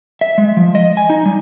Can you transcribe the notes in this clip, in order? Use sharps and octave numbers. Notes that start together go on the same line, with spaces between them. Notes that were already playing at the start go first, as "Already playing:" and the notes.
E5
G#3
F3
D#5
G#5
D#4
G3